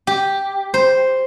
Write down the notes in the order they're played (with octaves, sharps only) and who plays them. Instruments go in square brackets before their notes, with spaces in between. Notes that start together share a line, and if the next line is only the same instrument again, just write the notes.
[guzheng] G4
C5